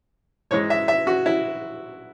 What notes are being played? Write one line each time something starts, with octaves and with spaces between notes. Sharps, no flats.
G#2 E3 G#3 C#5
E5
E5
F#4
E4